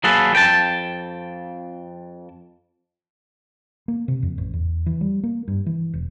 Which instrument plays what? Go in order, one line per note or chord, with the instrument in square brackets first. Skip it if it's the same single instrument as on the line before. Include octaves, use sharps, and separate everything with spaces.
[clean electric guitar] F#3 A#3 G#4 A4 B4
F2 G5 A5
[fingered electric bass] A#3
C3
F2
A1
E2
E3
G3
A#3
G2
E3
E1